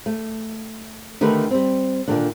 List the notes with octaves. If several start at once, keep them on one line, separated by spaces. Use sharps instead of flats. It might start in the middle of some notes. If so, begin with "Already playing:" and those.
A3
D3 D#3 A3 D#4 G4 B4
G3 C4
A#2 D3 D#3 D4